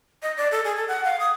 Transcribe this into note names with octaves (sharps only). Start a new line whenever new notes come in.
D#5
D5
A4
G#4
A4
F#5
F5
D#6